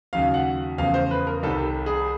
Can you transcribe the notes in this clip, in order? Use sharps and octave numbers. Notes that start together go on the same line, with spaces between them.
D#2 C#3 F#3 F5
F#5
E2 C#3 F3 A3 F5
C5
B4
A#4
C2 C3 D#3 G3 A4
G#4